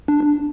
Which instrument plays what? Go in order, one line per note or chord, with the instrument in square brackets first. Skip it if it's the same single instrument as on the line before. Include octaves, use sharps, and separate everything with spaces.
[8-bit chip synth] D4